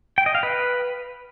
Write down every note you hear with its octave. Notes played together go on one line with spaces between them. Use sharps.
G5
D#5
F5
B4